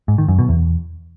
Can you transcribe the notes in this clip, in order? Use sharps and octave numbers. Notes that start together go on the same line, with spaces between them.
G#2
D#3
F#2
B2
E2